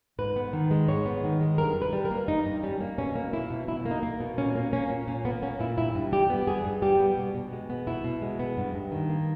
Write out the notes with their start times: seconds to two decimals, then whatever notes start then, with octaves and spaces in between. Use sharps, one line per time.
0.19 G#2 B4
0.36 B3
0.53 D#3
0.71 G#3
0.88 G#2 C#5
1.06 B3
1.24 D#3
1.41 G#3
1.58 G2 A#4
1.76 G2
1.82 B4
1.93 G3
2.05 A#4
2.11 A#3
2.28 G2 D#4
2.46 G2
2.63 G3 C#4
2.81 A#3
2.98 B2 C#4
3.15 A#3
3.33 A#3 E4
3.50 B2
3.68 B2 E4
3.86 A#3
3.91 D#4
4.03 A#3
4.21 B2
4.38 A#2 C#4
4.55 A#3
4.73 A#3 C#4
4.90 A#2
5.08 A#2 C#4
5.25 A#3 B3
5.42 A#3 C#4
5.60 A#2 E4
5.77 G2 E4
5.95 G2
6.12 G3 G4
6.30 B3
6.47 G2 G#4
6.65 G2
6.82 G3 G4
7.00 B3
7.17 B2
7.35 B2
7.53 G#3
7.70 B3
7.87 B2 E4
8.04 B2
8.22 G#3
8.39 B3
8.57 G2
8.75 G2
8.92 D#3
9.09 A#3